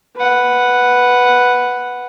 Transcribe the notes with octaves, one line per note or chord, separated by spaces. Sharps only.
B4 F#5